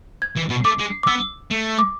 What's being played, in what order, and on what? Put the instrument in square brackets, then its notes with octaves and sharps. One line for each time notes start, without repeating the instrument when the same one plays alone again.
[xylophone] G#6
[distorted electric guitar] E3
B2
[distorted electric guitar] A3 [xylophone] D6
[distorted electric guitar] G#3
[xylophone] D6
[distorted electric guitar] B3 [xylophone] E6
[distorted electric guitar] A3
[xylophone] D6